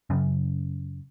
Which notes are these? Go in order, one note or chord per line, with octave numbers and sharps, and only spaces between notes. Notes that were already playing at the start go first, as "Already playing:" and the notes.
F#2 C#3